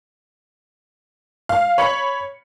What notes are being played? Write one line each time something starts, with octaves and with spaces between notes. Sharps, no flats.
F5
C#5 B5 C#7